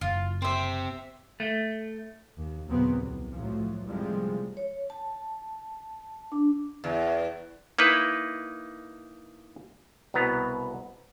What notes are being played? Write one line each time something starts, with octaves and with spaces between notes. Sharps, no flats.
F#1 F4
C4 G4 C5 E5
A3
D#2
D#2 A#2 C#3 F#3 B3 C4
C2 C3
A2 F3 F#3 A3
A2 C3 F3 G3 G#3
C#5
A5
D4
E2
A#3 D#4 E4 B4
C2 B2 B3 A#5